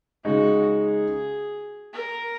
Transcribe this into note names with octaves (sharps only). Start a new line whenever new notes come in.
C#3 G#3 D#4 F#4
G#4
A#4